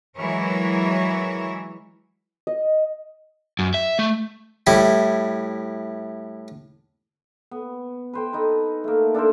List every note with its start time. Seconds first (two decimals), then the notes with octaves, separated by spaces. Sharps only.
0.18 E3 F#3 G#3 E4 A#4 C#5
2.47 D#5
3.59 F#2
3.74 E5
3.99 A3
4.67 A2 G3 E4
7.51 B3
8.13 B4 C5 G5
8.33 D#4 A4 B4
8.84 A3 A#3
9.14 D4 A4 A#4 C5